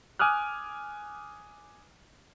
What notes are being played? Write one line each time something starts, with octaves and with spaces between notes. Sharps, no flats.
G#5 D6 D#6 F6 F#6